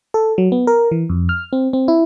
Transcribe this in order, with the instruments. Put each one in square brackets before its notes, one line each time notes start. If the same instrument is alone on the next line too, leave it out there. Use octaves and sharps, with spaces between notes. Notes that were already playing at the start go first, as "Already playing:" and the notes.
[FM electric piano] A4
F#3
B3
A#4
E3
F2
F6
C4
C4
E4